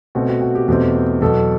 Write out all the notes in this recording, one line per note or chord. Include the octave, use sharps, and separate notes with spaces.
B2 A3 C4 F#4
F#4
F#4
G4
E2 B2 A3 C4
E2 B2 F#3 A4